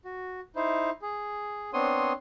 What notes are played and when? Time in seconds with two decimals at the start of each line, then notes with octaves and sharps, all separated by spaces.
0.05 F#4
0.56 D#4 E4 C5
1.02 G#4
1.73 B3 C4 D4 C#5 C6 D#6